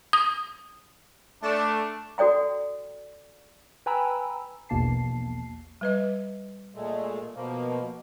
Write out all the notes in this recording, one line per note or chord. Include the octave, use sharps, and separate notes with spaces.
D#6
A3 D4
F#4 A4 D5 G5 A#5
B4 G5 G#5 A#5 B5 E6
A#1 E2 B2 A#3 A5 C7
G3 B4 D#5
A#2 G#3 A3
B2 F3 A#3